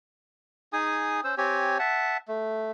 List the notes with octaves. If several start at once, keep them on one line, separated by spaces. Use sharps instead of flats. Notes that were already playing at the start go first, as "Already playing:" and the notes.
D#4 G#4 G#5 D#6
C#4 C5 E6
C4 G4 C#5 G#5
E5 F#5 A5
A3